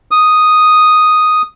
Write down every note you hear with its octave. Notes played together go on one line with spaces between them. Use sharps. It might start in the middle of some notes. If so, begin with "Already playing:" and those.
D#6